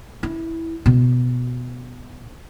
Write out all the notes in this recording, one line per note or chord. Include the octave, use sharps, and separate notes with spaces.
E4
B2